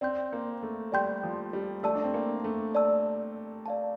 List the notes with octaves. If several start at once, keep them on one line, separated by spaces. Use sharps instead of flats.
C4 D5 G5 C6 G6
A#3
A3
G3 D5 G5 C6 G6
F3
G3
A3 D5 A5 E6
D4
C4
A#3
A3
D5 A5 E6
D5 F5 A5